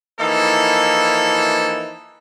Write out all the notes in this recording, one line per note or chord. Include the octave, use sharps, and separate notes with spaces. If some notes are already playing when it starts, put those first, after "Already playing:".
E3 F3 A#3 D#4 E4 A4